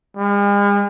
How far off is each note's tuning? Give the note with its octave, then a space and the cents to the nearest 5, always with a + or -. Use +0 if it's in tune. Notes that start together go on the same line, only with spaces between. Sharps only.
G#3 -45